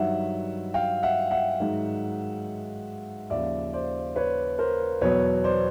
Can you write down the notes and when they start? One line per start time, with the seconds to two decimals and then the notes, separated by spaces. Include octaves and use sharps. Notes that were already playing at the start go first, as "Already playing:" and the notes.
Already playing: G2 D#3 F#3 E5 F#5
0.74 F5 G5
1.03 E5 F#5
1.31 E5 F#5
1.60 G#2 D#3 F#3
3.30 D#2 C#3 F3 D5 E5
3.73 C5 D5
4.16 B4 C#5
4.58 A#4 C5
5.01 E2 B2 F#3 B4 C#5
5.44 C5 D5